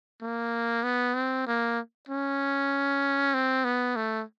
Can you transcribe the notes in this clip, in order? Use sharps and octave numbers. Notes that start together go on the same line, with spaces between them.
A#3
B3
C4
A#3
C#4
C4
B3
A3